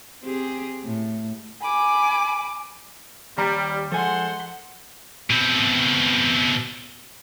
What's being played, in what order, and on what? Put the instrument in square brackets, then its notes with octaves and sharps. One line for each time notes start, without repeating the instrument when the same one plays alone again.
[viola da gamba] C4 G4 G#4
A2
[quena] G#5 [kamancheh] B5 D6
[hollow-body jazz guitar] D#2 A#5 [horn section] G3
[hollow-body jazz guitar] F3 G#5 [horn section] G#3 A4 C5 [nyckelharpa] F#5 C6
[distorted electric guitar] B2 C4